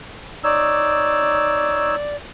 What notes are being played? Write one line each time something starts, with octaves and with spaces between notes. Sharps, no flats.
D#4 C#5 D5 E6